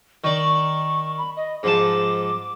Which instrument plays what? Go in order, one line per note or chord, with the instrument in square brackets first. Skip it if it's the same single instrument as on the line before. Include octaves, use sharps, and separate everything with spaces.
[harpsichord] D#3 D5 [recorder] C#6
[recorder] B5
D#5
[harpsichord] G#2 F3 A5 [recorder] D6